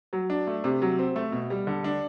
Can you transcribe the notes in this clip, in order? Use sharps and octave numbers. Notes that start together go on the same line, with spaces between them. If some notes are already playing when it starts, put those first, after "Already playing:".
F#3
D4
A3
C3
F#3
C4
A3
B2
G3
D3
D4